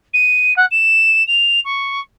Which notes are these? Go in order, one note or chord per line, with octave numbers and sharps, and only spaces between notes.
D#7
F#5
E7
F7
C#6